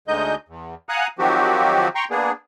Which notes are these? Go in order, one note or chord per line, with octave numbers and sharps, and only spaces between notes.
D2 D3 G#3 D#4 D#5 G6
E2
F5 F#5 G#5 A#5 D#6 F#6
D#3 F3 F#3 C4 F#4 G4
G5 A#5 C6 C#6
A#3 B3 D4 G#4